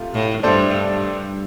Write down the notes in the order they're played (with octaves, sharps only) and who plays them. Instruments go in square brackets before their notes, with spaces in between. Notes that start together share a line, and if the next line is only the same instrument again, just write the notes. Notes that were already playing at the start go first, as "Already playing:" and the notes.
Already playing: [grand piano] C3 A3 F4
[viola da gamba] A2
[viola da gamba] G2 [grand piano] A3 D4 A4 C5
[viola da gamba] G2